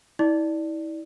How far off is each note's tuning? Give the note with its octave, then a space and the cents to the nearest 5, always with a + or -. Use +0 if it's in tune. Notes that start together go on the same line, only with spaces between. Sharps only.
E4 -40 D5 +0